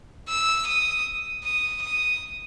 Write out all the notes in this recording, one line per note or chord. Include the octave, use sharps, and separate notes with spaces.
E6
D#6
D#6
D#6